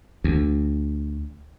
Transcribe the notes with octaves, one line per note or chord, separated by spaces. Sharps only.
D2